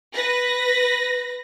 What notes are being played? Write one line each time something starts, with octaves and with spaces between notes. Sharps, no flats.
B4 A#6